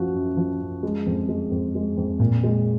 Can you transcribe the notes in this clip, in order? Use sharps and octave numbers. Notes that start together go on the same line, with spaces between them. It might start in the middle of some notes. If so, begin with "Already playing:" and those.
Already playing: F#2 F3 F#4
F#2
F3
F#2
G#3
F2
G#3
F2
G#3
F2
A#2
G#3